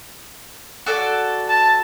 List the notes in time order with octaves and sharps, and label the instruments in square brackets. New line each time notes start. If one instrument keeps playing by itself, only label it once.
[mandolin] F#4 A4 D5
[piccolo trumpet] A5